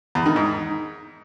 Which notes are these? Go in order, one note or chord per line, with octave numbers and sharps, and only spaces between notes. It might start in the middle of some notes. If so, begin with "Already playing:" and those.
E2
D#3
G#2